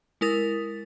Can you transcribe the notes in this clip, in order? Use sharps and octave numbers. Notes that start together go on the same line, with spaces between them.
G#3 E4 A#4 D#6 A6